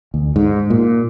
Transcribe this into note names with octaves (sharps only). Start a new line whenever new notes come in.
D2
G#2
A#2